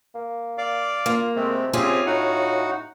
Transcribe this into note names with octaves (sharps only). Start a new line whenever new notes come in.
A#3
D5 F5 D6
A#3 F4
C3 G#3 A3 C4
C4 C#4 F4 G4 G#4
A2 D#4 F#4 F#5